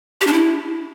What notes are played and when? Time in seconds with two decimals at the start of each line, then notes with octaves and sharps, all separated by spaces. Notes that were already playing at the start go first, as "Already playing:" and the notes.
0.21 G4
0.27 D4
0.33 E4